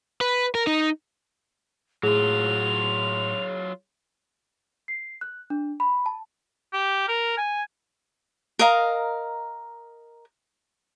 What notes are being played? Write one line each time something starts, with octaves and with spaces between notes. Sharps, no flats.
B4
A#4
D#4
A2 F#3 F4 G#4 F7
C7
F#6
D4
B5
A5
G4
A#4
G#5
A#4 D#5 F5 A#5